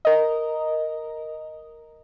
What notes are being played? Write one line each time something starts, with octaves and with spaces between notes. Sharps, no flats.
A#4 D#5